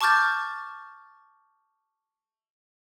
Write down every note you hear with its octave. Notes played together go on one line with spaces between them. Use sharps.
A5 C#6 D6 F6 G6 A6